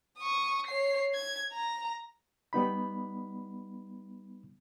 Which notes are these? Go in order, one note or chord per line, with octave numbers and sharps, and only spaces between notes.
C#6 D#6
C#5 C7
G#6
A#5
G3 B3 D#4 B5